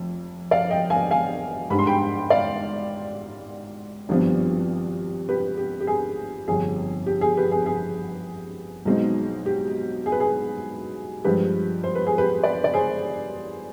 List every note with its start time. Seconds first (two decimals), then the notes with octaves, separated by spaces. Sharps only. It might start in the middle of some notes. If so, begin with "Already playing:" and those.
Already playing: F1 F2
0.51 D5 F5
0.70 D#5 G5
0.90 F5 G#5
1.11 F5 G#5
1.70 G#2 G3 D4 B5
1.79 C6
1.87 G5 B5
2.30 D5 F5
4.09 G#1 G2 F3 B3 D4
5.29 G4 B4
5.57 G4
5.81 G4
5.87 G#4
6.48 G1 F2 C3 G#4
7.06 G4
7.21 G#4
7.37 G4 B4
7.52 G#4
7.66 G#4
8.85 B1 B2 G#3 C4 D#4
9.46 G4
10.06 G#4
10.12 B4
10.20 G#4
11.24 G2 F3 G#3 G4 B4
11.84 C5
11.95 B4
12.07 G#4
12.18 G4 B4
12.44 B4 D5
12.64 D5
12.74 G#4 C5